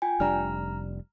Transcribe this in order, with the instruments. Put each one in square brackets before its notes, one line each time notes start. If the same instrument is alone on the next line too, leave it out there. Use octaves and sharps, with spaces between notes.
[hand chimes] F4 G5 G#5
[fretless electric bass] F1 G3 D4 [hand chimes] A#5 F6